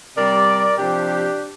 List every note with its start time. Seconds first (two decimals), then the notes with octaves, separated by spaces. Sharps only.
0.17 C3 G3 A#4 D5
0.78 C3 F3 D4 G4